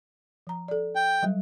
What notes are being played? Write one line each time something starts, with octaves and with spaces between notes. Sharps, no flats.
F3 A#5
A4 D5
G5
F#3 G3